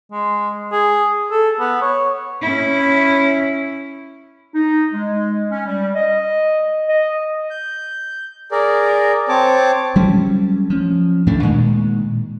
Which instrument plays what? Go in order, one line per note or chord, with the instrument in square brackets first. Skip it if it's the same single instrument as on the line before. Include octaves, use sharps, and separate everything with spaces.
[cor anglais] G#3
G#4
A4
B3
C#5
[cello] C#4 E4
[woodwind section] D#4
G#3
C#4
G3
D#5
D#5
[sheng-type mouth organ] G6
G#4 A#4 D5
C4 C#5 A5 D6
[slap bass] F#3 G3 A3 C#4
F3 C#4
D#2 A2 A3 D4
A#2 D#3 G#3